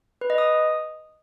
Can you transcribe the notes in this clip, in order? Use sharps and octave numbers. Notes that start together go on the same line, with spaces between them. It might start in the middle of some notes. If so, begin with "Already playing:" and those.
B4
D#5
D#6